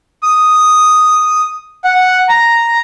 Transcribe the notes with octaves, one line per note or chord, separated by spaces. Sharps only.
D#6
F#5
A#5